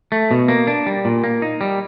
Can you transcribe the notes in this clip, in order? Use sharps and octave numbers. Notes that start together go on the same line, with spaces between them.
A3
B2
A#3
D4
G3
A#2
A#3
D#4
G3